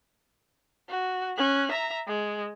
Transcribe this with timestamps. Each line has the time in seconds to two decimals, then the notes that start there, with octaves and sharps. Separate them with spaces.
0.89 F#4
1.37 C#4 F#6
1.72 E5 A#5
2.07 G#3